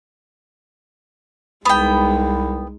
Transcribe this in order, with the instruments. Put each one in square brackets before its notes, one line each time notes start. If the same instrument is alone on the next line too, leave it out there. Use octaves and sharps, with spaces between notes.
[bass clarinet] C2 [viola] G#3 D#4 [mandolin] B3 G5